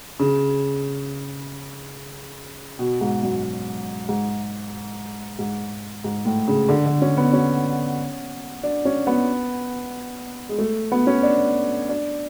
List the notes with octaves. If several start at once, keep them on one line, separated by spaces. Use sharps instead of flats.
C#3
B2
G#2
F#2
G#2
G#2
G#2
A2
C#3
D3
D3
C#4
B3
C#4
D4
C#4
B3
G#3
A3
B3
C#4
D4
D4